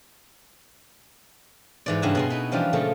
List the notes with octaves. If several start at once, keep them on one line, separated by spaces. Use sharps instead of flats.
G#2 E3 D5
G2 C#3 F#4 E5 G#5 A5
B2 C#4 G#4 C#5 C6
D#4 E4 B4
E3 F3 G3 C#4 D4 F4
A#2 C#3 F3 A3